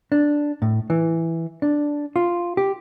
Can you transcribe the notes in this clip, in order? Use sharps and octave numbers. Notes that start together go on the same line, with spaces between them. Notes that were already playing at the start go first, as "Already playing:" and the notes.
D4
A2
E3
D4
F4
G4